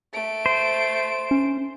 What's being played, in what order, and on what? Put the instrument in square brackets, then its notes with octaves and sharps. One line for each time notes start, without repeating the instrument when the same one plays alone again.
[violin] A3 D7
[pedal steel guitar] C5
[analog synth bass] C#4